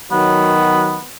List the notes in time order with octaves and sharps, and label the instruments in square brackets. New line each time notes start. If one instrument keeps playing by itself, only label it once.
[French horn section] D#3 F#3 [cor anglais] B3